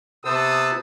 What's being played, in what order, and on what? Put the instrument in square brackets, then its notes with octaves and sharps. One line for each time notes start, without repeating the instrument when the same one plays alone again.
[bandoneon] C3 C5 E6 [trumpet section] B3 A5 D#6